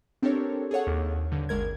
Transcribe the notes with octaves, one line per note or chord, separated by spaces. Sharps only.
C4 D4 G4 A4 A#4 C#5
G#4 A4 C#5 F#5
D#2
G2 D3
G#1 G#3 A#4 G#6